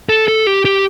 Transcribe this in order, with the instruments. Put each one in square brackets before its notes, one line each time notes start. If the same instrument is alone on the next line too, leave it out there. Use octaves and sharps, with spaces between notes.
[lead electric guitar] A4
A4
G4
G4